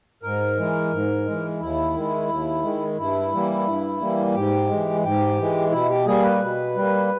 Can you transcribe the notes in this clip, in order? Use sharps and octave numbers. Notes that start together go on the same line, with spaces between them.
G#2 A#4
E3 G#3
G#2
G#3
E3
D#2 E4
D#3 G#3
D#2
D#3 G#3
G2 E4
E3 G3 A#3
G2
E3 G3 A#3
G#2 G4
E3 G#3
G#2 G4
E3 G#3
B2 E4
G4
G3 A#3 G#4
B4
B2
G3 A#3